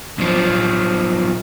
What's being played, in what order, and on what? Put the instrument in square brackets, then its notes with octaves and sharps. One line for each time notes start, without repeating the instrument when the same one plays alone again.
[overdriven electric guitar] B1 F3